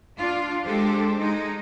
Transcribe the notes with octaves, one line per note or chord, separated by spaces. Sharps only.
D4 F4
G#3 D4 G4 A4 C5
G#3 D#4